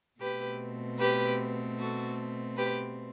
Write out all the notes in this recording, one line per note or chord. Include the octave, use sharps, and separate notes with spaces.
B2 A3 C4 G4 B4
G4 B4
F#4 A4
G4 B4